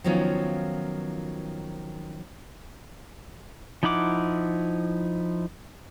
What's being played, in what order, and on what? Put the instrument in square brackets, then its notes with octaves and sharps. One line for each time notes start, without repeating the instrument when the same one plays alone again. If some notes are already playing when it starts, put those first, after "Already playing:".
[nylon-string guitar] D#3 F3 F#3 B3 C#4 F4
[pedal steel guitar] F3 D#4 E4 F#5 D6